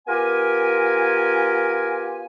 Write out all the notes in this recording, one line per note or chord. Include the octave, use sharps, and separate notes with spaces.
B3 F4 G4 A#4 G#5